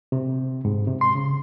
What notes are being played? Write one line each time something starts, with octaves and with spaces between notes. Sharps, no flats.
C3
G#2
C3
C6
C#3